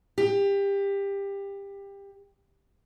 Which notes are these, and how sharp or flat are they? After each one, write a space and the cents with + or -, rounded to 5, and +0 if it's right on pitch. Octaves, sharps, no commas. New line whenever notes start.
G4 +20